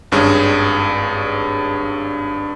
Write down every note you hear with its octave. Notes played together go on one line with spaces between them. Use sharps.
G#1 G2 C#4 G#4